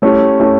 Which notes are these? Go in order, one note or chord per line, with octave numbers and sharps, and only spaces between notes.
A3 C#4 E4 G4
A3 C#4 E4 G4